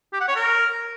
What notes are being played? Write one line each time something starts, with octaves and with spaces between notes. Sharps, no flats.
G4
F#5
C#5
A#4